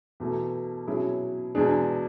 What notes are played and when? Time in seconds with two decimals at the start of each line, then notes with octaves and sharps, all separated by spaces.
0.20 E2 B2 A3
0.87 B2 F#3 C#4 E4 G#4
1.55 E2 B2 G#3 D4 G#4